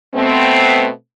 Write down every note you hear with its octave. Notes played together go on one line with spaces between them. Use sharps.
B2 A3 B3 C4